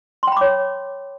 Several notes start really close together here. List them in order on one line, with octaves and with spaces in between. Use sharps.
C6 G5 B5 D6 C#5